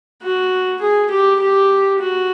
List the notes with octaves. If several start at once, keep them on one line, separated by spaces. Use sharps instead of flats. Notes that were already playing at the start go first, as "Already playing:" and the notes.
F#4
G#4
G4
G4
F#4